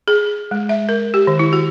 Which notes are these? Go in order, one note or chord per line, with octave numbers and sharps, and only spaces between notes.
G#4
G#3
E5
A#4
G4
D#3
E4
F#4